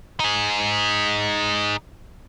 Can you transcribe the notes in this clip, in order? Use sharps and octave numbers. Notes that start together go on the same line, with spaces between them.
D#4 G#4